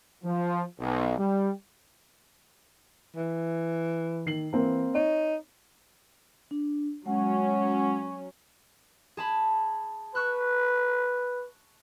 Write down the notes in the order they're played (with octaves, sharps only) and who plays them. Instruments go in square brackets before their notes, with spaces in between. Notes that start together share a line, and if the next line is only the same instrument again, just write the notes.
[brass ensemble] F3
B1
G3
[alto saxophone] E3
[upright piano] D#3 C7 F#7
[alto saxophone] E3 [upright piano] A#3 C4
[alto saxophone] D#4 [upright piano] C#5
[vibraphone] D4
[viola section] F#3 C#4 [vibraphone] G#3 F#5
[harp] G#4 A5 B5
[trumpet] B4 [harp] C#6 E6 F#6